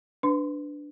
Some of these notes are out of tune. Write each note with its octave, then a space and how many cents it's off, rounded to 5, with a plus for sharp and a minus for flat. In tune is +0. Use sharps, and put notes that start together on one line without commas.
D4 +0 B4 +15 C6 -40